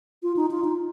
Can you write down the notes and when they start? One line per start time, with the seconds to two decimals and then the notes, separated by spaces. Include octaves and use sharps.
0.23 F4
0.36 D#4
0.51 F4
0.64 D#4